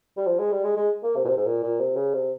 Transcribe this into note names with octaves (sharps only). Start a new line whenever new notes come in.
G3
F3
G#3
G3
G#3
G#3
A#3
C3
A#2
C3
G#2
A#2
A#2
C3
C#3
C3